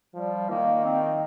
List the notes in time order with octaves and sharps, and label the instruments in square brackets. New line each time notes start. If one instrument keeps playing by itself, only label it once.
[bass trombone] F3 [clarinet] G3
[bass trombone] D#3 [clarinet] A#3
[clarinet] C4